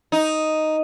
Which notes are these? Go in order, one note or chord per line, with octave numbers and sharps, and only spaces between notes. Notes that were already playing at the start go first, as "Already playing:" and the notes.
D#4